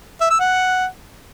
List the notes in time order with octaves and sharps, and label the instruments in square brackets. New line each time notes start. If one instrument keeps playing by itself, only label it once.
[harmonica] E5
E6
F#5